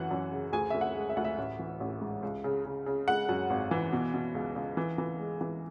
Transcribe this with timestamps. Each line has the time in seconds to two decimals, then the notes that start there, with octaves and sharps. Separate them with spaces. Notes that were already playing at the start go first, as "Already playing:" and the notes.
Already playing: F#2 E3 F#5
0.11 F#2
0.32 C#3
0.52 D2 G#4 G#5
0.70 D2 E5
0.81 F#5
0.95 G#3
1.09 E5
1.17 D2 F#5
1.24 E5
1.38 A1
1.59 E3
1.80 A1
2.01 G#2
2.23 C#2
2.44 C#3
2.65 C#3
2.86 C#3
3.08 G#3 F#5
3.29 F#2
3.50 G#1
3.71 E3
3.92 B2
4.14 B2
4.35 C#2
4.56 C#2
4.77 E3
4.98 E3
5.19 G#3
5.41 E3